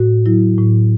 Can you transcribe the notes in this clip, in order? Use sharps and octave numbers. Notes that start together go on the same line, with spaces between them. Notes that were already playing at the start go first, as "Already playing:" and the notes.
Already playing: A2 F#4
F#3 E4
A2